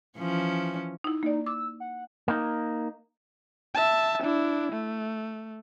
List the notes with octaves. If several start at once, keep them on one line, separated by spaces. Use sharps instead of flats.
E3 F3 C#4
D#4 E4
A#3 D#4 D5
D6 E6
F#5
A#3 D#4
E5 A5
D4 E4
A3